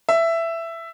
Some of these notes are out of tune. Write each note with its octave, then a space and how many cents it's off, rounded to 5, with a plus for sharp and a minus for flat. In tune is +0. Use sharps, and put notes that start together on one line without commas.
E5 +10